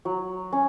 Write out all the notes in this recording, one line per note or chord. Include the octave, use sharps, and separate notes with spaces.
F#3
C#4